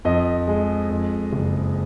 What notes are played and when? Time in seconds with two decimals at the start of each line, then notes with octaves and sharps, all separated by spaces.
0.05 F2 D#5
0.48 G#3
0.90 F2
1.33 F#1